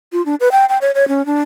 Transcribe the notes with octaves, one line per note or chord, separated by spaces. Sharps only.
F4
D4
B4
G5
G5
C#5
C#5
C#4
D4